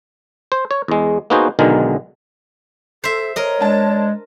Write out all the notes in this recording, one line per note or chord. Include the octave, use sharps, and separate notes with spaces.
C5
C#5
E2 G#3
A#3 B3 D#4 F#4 G#4 C5
B1 B2 D3 D#3 G#3 A#4
A4 C5 E5
A#4 C#5 D#5
G#3 D4 A5